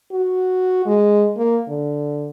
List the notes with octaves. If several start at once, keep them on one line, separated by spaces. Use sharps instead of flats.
F#4
G#3
A#3
D3